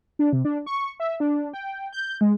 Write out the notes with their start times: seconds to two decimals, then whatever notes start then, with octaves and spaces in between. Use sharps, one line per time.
0.19 D4
0.33 C3
0.45 D4
0.66 C#6
1.00 E5
1.20 D4
1.54 G5
1.93 G6
2.21 G#3